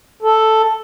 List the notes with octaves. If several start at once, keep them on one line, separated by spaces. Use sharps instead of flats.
A4